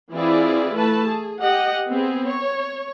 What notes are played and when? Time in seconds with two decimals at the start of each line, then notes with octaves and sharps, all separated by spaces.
0.12 E3 C4 E4 F4 G#4 D5
0.73 A3 B4 A5
1.06 G#4
1.40 G4 D#5 F#5
1.88 B3 C4 G#4
2.27 C#5